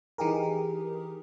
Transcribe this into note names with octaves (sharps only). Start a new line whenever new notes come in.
E3 D#4 G4 G#4 A#4